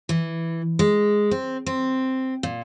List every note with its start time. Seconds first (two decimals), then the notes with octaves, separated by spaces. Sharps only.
0.09 E3
0.79 G#3
1.31 C4
1.66 C4
2.43 A#2